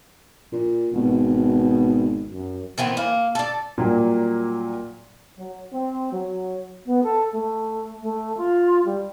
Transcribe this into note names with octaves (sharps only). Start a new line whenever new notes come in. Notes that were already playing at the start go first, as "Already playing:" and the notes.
A#2
G#1 B2
F#2
D#3 E3 B3 C4
A#3
A4 D5
A#2 F#3 G3 A#3
F#3
C4
F#3
B3
A4
A3
A3
F4
G3